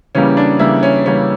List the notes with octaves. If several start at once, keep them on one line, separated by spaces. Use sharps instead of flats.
C#3 E3 G3 A#3 C#4
D4
C#3 E3 G3 A#3 E4
C#4
C#3 E3 G3 A#3 C#4